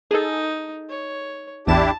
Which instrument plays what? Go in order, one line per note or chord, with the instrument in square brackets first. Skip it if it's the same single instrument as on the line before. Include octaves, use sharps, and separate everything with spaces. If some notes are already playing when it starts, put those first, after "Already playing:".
[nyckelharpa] D#4 [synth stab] G#4 A4
[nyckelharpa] C#5
[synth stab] A1 E2 E7 [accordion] D4 E4 G4 [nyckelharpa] A5